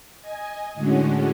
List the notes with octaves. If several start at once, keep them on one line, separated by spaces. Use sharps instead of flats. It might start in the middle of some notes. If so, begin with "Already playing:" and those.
D#5 G#5
A2 D3 G#3 C#4 F#4